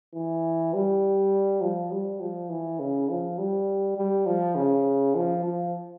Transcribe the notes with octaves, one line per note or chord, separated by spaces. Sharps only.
E3
G3
F3
G3
F3
E3
C#3
F3
G3
G3
F3
C#3
F3
F3